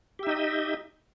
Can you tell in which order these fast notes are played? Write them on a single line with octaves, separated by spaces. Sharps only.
G4 E5 D#4 D#5